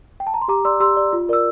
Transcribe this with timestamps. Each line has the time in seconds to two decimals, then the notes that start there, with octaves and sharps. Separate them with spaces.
0.20 G5
0.27 A5
0.34 A#5
0.41 C6
0.48 G4 A#5 D6
0.65 D5 C6 E6
0.80 G4 C6 E6
0.97 D5
1.13 F4
1.29 A#4 D5 E6